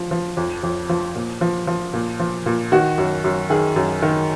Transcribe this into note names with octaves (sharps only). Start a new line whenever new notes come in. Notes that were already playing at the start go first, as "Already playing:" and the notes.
Already playing: F3
F3
F2
F2
F3
A#2
F3
F3
A#2
F3
A#2
D#3 F#4
F#2
F#2
D#3 G#4
F#2
D#3